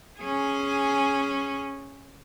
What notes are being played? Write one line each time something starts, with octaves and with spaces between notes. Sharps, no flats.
C#4 G#4